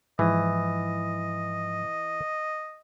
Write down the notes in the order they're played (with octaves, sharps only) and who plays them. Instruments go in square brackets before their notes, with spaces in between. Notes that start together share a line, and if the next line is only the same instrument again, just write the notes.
[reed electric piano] G#2 F3 D#6 [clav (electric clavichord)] E3 [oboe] D#5